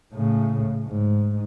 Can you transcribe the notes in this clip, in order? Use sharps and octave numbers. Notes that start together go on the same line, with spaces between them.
A2 C#3
G#2